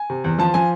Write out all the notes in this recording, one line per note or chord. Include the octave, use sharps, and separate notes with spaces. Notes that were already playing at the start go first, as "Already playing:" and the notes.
Already playing: G#5
C3
E2
F3 A5
F3 G#5